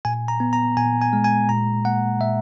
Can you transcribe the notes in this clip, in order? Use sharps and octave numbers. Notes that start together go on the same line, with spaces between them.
A#2 G#5
A#5
B3
A#5
A#2 G#5
G#5
G#3
G#5
A#2 A#5
A#3 F#5
A#2 E5